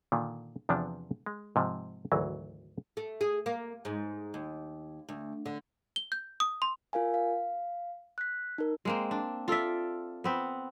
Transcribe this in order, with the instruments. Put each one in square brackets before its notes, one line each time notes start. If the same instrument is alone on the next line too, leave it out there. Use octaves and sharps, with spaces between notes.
[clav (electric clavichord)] A#2 D3 D#3
E2 C3 F3 B3 D4
G#3
G#2 C3 F3
G#1 D2 E3 F#3
[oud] A3
G#4
A#3
G#2
D#2
D2
D3
[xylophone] G7
G6
D#6
C6
[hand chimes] F4 A#4 F5 G#5
F5
F#6 B6
D#4 A#4
[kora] G#3 A#3 C4
D4
F4 A4 D5 E5
B3 C4 B4